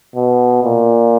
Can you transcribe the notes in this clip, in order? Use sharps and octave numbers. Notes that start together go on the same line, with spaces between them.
B2
A#2